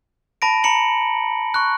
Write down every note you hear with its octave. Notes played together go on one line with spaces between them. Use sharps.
A5 B5 A#6 D7
A#5 B5 C#7 F#7
C#6 F#6